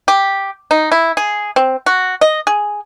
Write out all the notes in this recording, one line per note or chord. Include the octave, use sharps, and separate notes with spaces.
G4
D#4
E4
G#4
C4
F#4
D#5
G#4